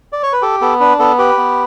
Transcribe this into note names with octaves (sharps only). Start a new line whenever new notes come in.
D5
C#5
B4
G4 A4
B3 A4
D4 B4
B3 A4
G4 B4
B3